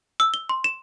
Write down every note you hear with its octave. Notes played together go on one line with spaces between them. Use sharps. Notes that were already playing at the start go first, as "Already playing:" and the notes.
E6
G7
C6
E7